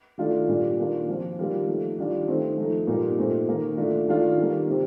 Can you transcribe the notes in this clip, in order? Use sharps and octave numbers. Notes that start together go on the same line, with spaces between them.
D#3 A3 D4 F4
A#2 G3 D4
D#3 A#3 D4 F4
F3 C4 F4
D#3 G3 A#3 F4
F3 A3 D#4
D#3 G3 D4 F4
D#3 A3 C4 D#4
F3 A3 D#4
A#2 G3 A#3 D#4
A#2 A3 C4 D#4
D#3 A#3 D#4
D3 A3 D4 F4
D#3 A3 D4 F4
D#3 G3 A#3
C3 G3 C4 D#4